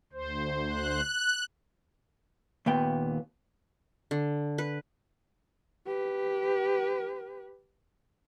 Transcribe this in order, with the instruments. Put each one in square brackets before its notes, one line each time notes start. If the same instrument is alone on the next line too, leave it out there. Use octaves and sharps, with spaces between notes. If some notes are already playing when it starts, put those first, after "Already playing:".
[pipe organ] D2 C5
[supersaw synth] F#6
[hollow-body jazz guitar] D#2 A#2 B3 G5
[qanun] D3
B4
[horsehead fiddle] G4 B4